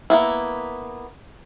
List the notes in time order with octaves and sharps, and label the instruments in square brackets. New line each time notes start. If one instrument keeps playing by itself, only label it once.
[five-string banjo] A#3 B3 E4